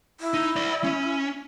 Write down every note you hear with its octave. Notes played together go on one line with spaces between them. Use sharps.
E4
D#4
D5 E5
C#4